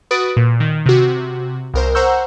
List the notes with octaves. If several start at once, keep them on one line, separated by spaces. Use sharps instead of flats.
F#4 B4 D#6 A6 D7
A#2
D#3
C3 F#4
C2 A#4 C5
C5 F#5 A#5 C#6 E6 G6